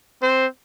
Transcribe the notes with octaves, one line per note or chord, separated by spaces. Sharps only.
C4 C5